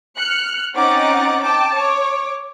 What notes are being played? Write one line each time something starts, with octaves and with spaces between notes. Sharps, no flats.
F6 F#6 C#7
C4 C#4 D#4 F#5 D6 A6
G5 A5 D6
C#5 D6